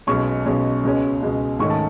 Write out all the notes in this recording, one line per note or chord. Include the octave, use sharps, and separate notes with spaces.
B1 B2 G#3 C#4 C#6
B1 B2 G#3 C#4
C#2 B2 G#3 C#4
C#2 B2 G#3 C#4
G#2 D#3 A3 C#4 C#6
A5